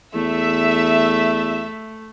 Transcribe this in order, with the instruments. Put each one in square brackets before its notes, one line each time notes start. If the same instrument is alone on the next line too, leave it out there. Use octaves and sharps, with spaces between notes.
[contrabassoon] E2 [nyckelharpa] A3 [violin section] E5